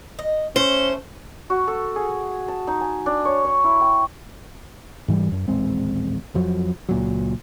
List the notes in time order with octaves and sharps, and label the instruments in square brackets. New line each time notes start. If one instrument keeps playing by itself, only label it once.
[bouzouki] D#5
[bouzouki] A3 [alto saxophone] C#4 [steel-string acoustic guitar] C5 [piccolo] G7
[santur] F#4
A4
G#4
A5
D#4
G#5
D4
C#5
C#5
E4
G5
[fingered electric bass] G#2 E3 F#3 G3
F#2
D#1 A1 G#3 C4
F2 F3 F#3
C#2 A#2 F#3